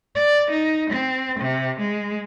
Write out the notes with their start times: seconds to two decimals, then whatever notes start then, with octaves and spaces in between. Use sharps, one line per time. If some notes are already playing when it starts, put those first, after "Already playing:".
0.16 D5
0.51 D#4
0.90 C4
1.40 C3
1.80 G#3